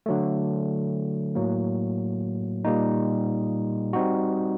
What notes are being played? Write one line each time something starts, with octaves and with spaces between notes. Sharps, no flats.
D3 F#3 A3
A2 F#3 A#3
A#2 G3 A#3 D#4
G3 C4 D#4 F#4